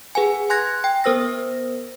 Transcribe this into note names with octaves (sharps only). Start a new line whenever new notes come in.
G#4 B4 F#5 G#5
G#5 C6 F#6 G#6 A#6
G5
B3 A#4 C5 E6 A#6